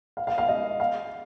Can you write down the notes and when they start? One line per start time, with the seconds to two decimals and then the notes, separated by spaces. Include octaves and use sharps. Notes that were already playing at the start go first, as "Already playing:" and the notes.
0.17 F5
0.27 F5
0.38 F5
0.49 D#5
0.80 F5